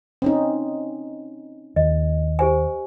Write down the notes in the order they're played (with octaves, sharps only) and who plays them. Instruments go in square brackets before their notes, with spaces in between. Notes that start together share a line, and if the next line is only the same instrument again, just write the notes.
[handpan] C4 C#4 D#4
[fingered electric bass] D#2 [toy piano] D#5
[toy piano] G4 C5 G#5